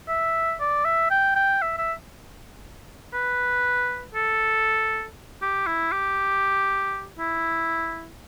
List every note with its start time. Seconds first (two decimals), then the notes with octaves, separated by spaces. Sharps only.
0.09 E5
0.60 D5
0.85 E5
1.10 G5
1.36 G5
1.62 E5
1.78 E5
3.14 B4
4.14 A4
5.42 G4
5.67 E4
5.92 G4
7.19 E4